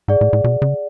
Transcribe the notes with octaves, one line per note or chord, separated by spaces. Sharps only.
G#2 G#4 D5 F#5
A2
A2
B2
C#3